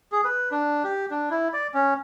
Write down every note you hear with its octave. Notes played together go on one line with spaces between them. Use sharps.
G#4
B4
D4
G4
D4
E4
D5
C#4